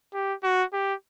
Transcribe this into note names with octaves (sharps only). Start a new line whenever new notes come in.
G4
F#4
G4